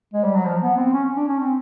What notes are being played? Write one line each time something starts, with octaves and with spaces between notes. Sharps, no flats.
G#3
G3
F#3
F3
B3
C4
C#4
D4
C#4
C4